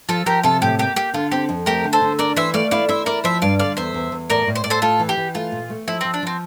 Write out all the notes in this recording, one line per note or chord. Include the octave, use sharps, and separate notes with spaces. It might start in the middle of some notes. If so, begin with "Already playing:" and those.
F3 F4 A4
F3 G4 A#4
C3 F4 A4
A2 G4
A#3 G4
A#3 G4
D3 F4
C4 G4
F2
A3 G4 A#4
D3
A4 C5
D3
D4 A#4 D5
E3 C5 E5
A3 D5 F5
E4 D5 F5
E4 C5 E5
E4 A#4 D5
F3 C5 E5
G2 D5 F5
D3 D5 F5
E2 C5 E5
E2
E2
A2 A#4 D5
A2
C5
A2 D5
A4 C5
A3 F4 A4
E3
G4
E3
A3 F4
A#2
A3
F3 E4
F3 C4
D4
F3 C4